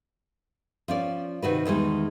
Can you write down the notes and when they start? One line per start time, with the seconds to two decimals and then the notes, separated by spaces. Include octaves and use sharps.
0.88 F3 C#4 D5
1.42 C3 D#3 F#4 B4
1.65 E2 D#3 G3 G#3